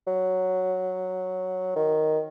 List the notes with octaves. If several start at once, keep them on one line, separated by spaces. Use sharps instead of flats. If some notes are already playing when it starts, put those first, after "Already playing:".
F#3
D#3